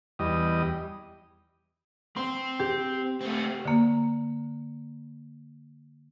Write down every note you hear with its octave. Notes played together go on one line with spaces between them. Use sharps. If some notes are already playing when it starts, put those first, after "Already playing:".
E2 G3 D#5
C4 C6
G4
A3 C4
D3 A#3